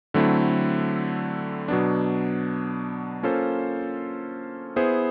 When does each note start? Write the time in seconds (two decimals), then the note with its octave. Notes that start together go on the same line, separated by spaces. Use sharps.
0.14 D3 F#3 A3 C4 E4
1.68 B2 F#3 B3 D4
3.23 A#3 C#4 F4 A4 C5
4.76 B3 E4 G#4 C5